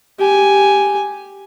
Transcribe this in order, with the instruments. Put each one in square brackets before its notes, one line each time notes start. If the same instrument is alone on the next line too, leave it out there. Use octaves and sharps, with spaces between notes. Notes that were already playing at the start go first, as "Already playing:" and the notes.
[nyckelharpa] G4 G#5